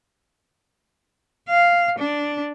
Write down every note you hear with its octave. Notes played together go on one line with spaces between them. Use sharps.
F5
D4